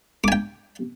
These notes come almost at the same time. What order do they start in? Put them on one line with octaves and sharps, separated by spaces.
D6 G#5 G5